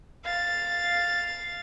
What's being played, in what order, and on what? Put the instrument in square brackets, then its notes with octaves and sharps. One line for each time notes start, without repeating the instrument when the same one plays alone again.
[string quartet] F5 A6